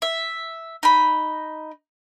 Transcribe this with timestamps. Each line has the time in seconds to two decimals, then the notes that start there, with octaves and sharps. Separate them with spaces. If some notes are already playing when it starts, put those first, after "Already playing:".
0.02 E5
0.83 D#4 B5